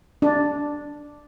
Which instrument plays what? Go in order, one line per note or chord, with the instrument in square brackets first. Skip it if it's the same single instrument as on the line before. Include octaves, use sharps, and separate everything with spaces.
[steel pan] D4